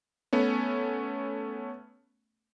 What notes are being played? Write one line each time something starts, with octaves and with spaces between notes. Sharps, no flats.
A3 B3 C#4